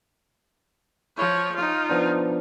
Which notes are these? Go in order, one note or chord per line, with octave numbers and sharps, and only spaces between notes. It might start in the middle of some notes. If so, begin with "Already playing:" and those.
F3 C#5
D#4 F4
F3 B3 D4